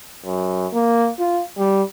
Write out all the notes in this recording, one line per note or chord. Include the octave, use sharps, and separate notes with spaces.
F#2
A#3
F4
G3